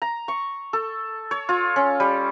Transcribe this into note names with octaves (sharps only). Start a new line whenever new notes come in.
A#5
C#6
A4
C#5
F4
C#4
G3